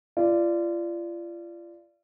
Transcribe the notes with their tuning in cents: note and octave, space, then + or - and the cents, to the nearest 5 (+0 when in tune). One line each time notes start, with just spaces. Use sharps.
F4 -35 D5 +0